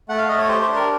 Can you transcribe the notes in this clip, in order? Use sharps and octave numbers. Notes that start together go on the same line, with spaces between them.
A3 F#5
F5
A3 D#5
C#5
G4 C5
C5
D4
A#4